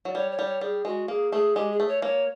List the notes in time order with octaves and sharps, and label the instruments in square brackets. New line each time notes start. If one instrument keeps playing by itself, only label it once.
[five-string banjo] F#3 [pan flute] D5
[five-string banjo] G3 [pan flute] C#5
[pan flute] C#5
[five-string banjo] G3
[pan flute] C#5
[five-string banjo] G3 [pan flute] G#4
[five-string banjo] G#3 [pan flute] F#4
[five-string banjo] A#3 [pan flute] G#4
[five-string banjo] A3 [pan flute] G#4
[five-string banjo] G#3 [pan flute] G4
[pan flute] G#4
[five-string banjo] A3
[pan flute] C#5
[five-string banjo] A#3 [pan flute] C#5